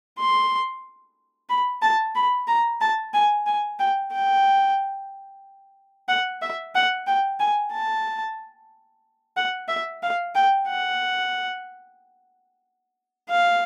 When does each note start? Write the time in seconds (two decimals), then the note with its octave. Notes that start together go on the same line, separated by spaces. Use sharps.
0.19 C6
1.49 B5
1.83 A5
2.15 B5
2.47 A#5
2.81 A5
3.14 G#5
3.46 G#5
3.79 G5
4.12 G5
6.08 F#5
6.42 E5
6.75 F#5
7.07 G5
7.40 G#5
7.72 A5
9.37 F#5
9.69 E5
10.03 F5
10.35 G5
10.68 F#5
13.30 F5